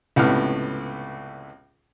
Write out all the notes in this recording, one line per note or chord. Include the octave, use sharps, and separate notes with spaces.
C#2 A2 C3 B3 F6